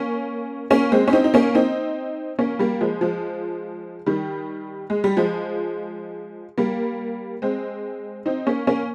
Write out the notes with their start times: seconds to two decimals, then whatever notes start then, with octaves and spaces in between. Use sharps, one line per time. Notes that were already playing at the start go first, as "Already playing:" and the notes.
Already playing: A#3 C#4
0.70 A#3 C#4
0.92 G#3 C4
1.08 C#4
1.13 C4 D#4
1.24 D#4
1.34 A#3 C#4
1.55 C4 D#4
2.39 A#3 C#4
2.59 G3 A#3
2.81 F3 G#3
3.01 F3 G#3
4.06 D#3 G3
4.90 G#3
5.04 G3
5.17 F3 G#3
6.58 G3 A#3
7.42 G#3 C4
8.26 C4 D#4
8.47 A#3 C#4
8.67 A#3 C#4